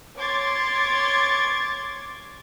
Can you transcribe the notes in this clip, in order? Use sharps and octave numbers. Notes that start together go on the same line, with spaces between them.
C#5 C6 D6 G#6 A6